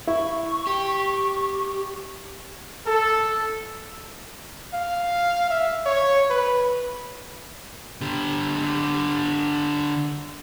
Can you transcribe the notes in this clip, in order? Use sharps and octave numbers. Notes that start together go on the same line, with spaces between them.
E4 C#6
G4
A4
F5
E5
C#5
B4
D3 G4